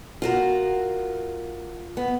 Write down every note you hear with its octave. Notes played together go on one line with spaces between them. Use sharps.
F4 F#4 A#4
B3